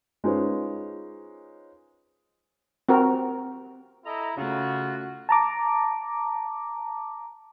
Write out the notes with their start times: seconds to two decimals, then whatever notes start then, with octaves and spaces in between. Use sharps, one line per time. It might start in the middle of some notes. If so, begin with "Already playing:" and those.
0.24 G#3 C#4 D#4 F4 B4 C5
2.89 C4 F#4 A#4
4.06 E4 A4 D#5 A#5
4.37 C#3 A3 C#4 F4 F#4
5.29 A5 A#5 D6